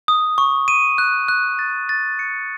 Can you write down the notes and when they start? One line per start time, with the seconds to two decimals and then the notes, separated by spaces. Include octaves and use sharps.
0.08 D#6
0.38 C#6
0.68 D#7
0.98 F#6
1.28 F#6
1.59 A6
1.89 A6
2.19 C#7